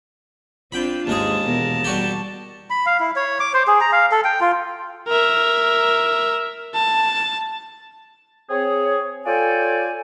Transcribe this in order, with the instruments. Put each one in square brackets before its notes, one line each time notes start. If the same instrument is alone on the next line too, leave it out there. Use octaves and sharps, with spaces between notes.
[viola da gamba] C4 D4 F4 [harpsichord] G5 B5
[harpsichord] D#2 G#3 G#4 [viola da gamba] G#2 [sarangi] A5
[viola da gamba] E2 B2 A#4
[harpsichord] G3 F#4 G4
[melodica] B5
F5
E4
C#5
D6
C5
G#4
A#5
F5
A4
G5
F4
[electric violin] A#4 E5
A5
[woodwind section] C4 G#4 C#5
F4 A4 C#5 D5 G5 G#5